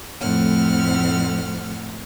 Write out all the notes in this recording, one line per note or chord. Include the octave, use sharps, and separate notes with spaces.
F2 A2 A3 C4 F#5 F6